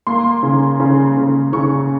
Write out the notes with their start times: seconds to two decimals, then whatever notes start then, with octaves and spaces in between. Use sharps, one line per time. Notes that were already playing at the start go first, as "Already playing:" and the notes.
0.07 A#3 C6
0.43 C#3
0.80 C#3
1.17 C#3
1.53 C#3 C#6